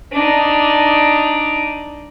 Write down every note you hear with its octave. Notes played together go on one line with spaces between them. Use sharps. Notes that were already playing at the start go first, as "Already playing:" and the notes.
D4 D#4